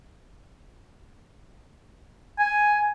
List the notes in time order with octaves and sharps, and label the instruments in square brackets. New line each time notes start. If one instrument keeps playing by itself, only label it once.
[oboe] G#5